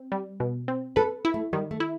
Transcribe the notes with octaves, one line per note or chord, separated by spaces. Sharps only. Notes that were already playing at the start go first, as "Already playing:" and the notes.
Already playing: C4
G3
B2
C4
A4 B4
E4
A3
D#3 G3
A3
E4